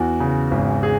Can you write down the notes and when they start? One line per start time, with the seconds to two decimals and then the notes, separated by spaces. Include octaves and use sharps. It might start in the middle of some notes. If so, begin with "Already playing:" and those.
Already playing: E2 F#4
0.20 C#3
0.51 G#1
0.83 G#4